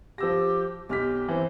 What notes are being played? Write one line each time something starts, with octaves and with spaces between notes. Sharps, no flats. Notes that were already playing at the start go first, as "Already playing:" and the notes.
F3 G4 E6 A#6
B1 G4 F6 B6
E3 C4